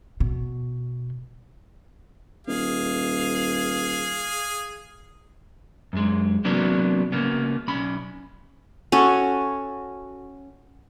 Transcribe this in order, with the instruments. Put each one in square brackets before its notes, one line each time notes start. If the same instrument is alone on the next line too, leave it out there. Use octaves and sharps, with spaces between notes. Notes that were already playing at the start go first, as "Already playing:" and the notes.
[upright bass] B2
[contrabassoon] D#1 [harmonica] G#4 F5
[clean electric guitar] F#2 G#3
C3 E3 F#3 A#3 B3 D4
C#3 A#3 B3
B1 C#4 B5
[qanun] C#4 F#4 A4